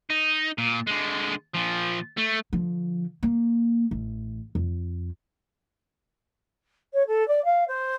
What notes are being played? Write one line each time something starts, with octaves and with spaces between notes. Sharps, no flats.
D#4
A#2
D3 G#3
A#2 F3
A3
D3 F3
A#3
A1
F2
C#5
A4
D5
F5
C5